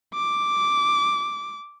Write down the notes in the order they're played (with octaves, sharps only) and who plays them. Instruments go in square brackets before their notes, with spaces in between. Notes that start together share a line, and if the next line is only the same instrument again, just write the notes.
[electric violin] D6